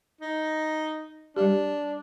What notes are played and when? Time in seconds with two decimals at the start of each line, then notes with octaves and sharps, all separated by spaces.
0.21 D#4
1.36 G3 D4 G4